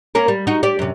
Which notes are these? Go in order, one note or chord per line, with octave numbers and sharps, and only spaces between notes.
A#3 C#4 A#4
G3
D#4 F#4
G4 D5
F#2 C3